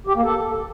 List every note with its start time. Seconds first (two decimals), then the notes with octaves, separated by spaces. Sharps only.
0.07 G4
0.15 A#3
0.24 A4